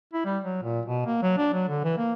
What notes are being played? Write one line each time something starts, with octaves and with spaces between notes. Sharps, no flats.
E4
G3
F#3
A#2
B2
A#3
F#3
D4
F#3
D3
E3
A#3